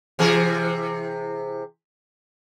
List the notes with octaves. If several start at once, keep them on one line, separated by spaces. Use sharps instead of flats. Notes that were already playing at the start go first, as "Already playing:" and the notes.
C3 E3 G#4